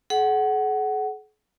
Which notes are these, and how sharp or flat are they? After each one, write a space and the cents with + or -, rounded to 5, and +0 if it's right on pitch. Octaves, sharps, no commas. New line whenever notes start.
G#4 +45 F#5 +15